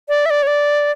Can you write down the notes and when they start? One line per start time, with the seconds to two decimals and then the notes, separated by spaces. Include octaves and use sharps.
0.09 D5
0.26 E5
0.30 D5
0.43 C#5
0.47 D5